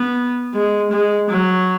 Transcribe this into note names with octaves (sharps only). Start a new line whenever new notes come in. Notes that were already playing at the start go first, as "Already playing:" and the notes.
Already playing: B3
G#3
G#3
F#3